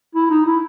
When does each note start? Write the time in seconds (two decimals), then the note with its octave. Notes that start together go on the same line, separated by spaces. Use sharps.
0.15 E4
0.30 D#4
0.46 E4